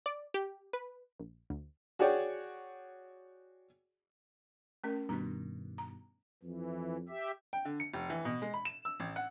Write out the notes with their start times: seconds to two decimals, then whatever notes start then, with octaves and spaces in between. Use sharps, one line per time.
0.06 D5
0.34 G4
0.73 B4
1.19 A#1
1.50 D2
1.99 F#4 G#4 C#5 D5 G5
4.84 A3 C#4 A#4
5.09 G2 B2 D#3 D#4 A#5
5.78 A#5
6.43 F2 E3
7.09 G4 E5
7.53 G5
7.65 D3
7.80 C#7
7.94 F1
8.10 E3
8.25 B2
8.42 G#3
8.54 B5
8.65 E7
8.85 E6
9.00 A1
9.16 F#5